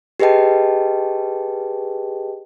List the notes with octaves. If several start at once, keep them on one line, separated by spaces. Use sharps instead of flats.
G4 G#4 B4 D#5 G5 A5